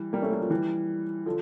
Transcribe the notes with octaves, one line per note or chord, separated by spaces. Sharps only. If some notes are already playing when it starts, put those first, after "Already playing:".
Already playing: E3 G3
G3 A#3
A3 C#4
G3 A#3
F3 A3
E3 G3
D3 F3